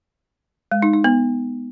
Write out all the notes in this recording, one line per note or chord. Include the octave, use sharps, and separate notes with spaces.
G#3
D#4
D#4
B3